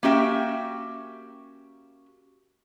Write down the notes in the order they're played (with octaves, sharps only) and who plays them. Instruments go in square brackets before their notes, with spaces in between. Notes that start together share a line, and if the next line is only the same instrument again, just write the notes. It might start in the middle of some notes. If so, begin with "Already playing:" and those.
[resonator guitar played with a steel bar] A#3 C#4 F#4 G4 E5 G5